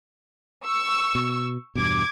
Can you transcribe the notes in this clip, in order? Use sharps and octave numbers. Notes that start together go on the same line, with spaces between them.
C#6 E6
B2
E2 G2 B2 D6 G#6